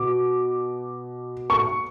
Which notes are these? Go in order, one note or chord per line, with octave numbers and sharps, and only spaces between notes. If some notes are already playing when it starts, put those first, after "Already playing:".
Already playing: B2 D6
C#6